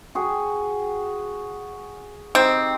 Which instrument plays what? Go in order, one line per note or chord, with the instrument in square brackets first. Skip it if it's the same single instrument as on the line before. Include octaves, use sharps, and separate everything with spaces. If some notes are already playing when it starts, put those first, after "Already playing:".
[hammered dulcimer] F#4 G#4 G5
[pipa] C4 [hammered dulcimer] D#4 G4